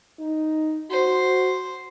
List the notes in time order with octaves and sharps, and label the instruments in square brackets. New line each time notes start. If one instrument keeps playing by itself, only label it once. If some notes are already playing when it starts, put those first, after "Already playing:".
[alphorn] D#4
[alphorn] F#4 [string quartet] C5